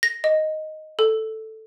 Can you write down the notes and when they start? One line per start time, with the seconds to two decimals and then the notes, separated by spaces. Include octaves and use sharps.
0.03 A#6
0.24 D#5
0.99 A4